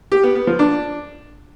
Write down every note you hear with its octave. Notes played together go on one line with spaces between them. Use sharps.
G4
B3
B3
F3
D4